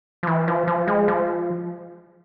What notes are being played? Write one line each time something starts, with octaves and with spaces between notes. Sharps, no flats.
F3
E3
F3
F3
G#3
F3